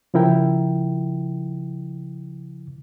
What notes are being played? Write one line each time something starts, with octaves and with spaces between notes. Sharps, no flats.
C#3 F3 E4 A#4 G5